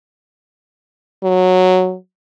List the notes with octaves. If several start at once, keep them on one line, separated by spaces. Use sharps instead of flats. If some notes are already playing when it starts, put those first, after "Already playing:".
F#3